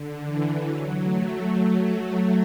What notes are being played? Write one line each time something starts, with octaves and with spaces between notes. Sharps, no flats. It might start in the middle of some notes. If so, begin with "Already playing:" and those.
Already playing: D3
E3
F#3
A3